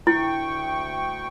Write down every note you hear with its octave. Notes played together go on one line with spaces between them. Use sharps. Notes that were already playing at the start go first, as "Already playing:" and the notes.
D2 E4 G5 C#6